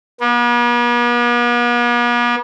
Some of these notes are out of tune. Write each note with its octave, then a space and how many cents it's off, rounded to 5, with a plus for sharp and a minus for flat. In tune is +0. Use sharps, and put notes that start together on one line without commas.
B3 -45